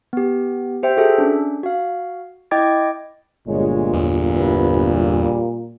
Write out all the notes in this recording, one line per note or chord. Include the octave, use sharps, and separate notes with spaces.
B3 G4
G4 C5 E5 G5
F#4 G#4 A4 E5
C#4 D4
F#4 F5
E4 D#5 G5 D6 G#6 A6
G1 A#2 G#3 C#5
E2
C3 B4
G3